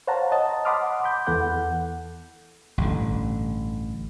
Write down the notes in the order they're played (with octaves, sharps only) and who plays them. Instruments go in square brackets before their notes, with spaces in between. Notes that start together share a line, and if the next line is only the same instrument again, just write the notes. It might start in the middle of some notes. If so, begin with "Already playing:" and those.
[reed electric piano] C5 C#5 F5 F#5 A5 A#5
D#5 A5
F#5 B5 C6 D6 D#6 F6
B5 D6 G6
E2 E3 B3 A4 F#5 G6
[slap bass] A1 G2 D3